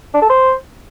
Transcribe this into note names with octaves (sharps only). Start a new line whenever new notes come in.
D4
A4
C5